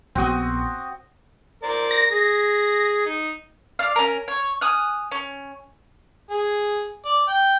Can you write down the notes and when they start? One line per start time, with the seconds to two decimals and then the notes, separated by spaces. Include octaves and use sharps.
0.15 A#1 B3 C4 F#4 D#6
1.63 A#4 C5 D5
1.91 A#6
2.12 G#4
3.05 D#4
3.79 D5 F5
3.96 C#4 A#4
4.28 C#5
4.61 G#5 D#6 F6 F#6
5.12 C#4
6.30 G#4
7.05 D5
7.28 G5